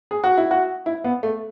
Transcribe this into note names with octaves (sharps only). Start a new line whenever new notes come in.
G#4
F#4
E4
F#4
E4
B3
A3